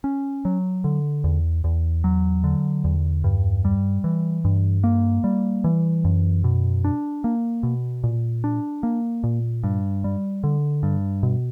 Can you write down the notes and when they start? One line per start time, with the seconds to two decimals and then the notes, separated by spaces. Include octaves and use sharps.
0.04 C#4
0.45 F#3
0.84 D3
1.24 E2
1.64 E2
2.04 F#3
2.44 D3
2.84 E2
3.24 G2
3.65 G3
4.04 E3
4.45 G2
4.84 A#3
5.24 G3
5.64 E3
6.05 F#2
6.44 B2
6.84 D4
7.24 A#3
7.63 B2
8.04 A#2
8.44 D4
8.83 A#3
9.24 A#2
9.64 G2
10.04 G3
10.44 D3
10.83 G2
11.23 B2